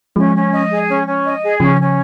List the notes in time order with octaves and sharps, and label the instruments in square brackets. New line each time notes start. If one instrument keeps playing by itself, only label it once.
[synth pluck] F3 G#3 [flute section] C#4
[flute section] C#4
D#5
G#4
C#4
C#4
D#5
G#4
[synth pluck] C#3 F3 [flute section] C#4
[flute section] C#4